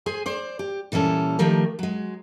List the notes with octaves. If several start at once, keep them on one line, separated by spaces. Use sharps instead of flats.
G#4 C5 G#5
C5 D5
G4
A#2 E3 G3 C#4 A4
D#3 F3 A3 G4 A#4
F#3 G#3